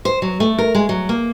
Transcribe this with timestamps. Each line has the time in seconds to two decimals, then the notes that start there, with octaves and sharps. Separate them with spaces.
0.05 C5
0.22 F#3
0.40 A3
0.58 A#4
0.75 G#3
0.89 F#3
1.09 A#3